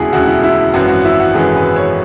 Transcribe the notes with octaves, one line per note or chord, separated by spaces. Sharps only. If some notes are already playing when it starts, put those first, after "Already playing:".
Already playing: E1 D2 C#3 E4 F#4 G#4
E1 D2 C#3 F#4
E4
E4
G#1 F#2 E3 F#4
F#4
E4
F#4
G#1 F#2 E3 G#4
B4
C#5